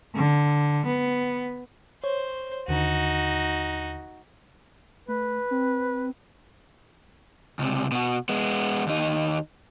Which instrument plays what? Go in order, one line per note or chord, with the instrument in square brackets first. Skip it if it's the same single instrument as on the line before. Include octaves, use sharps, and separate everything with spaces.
[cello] D3
B3
[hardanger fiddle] C5 [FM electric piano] C#5
[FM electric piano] D#2 D3 [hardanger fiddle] D#4 F#4
[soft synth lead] A3 [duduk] B4
[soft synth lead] C4
[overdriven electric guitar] C#2 C3
B2 F#4
G#3 B3
D#2 D#4